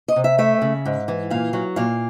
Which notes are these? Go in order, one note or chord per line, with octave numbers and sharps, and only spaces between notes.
D#5
C3
E5
A3 E5
C#3
G#2
E3
A#2 F5
F#3
A#2 F5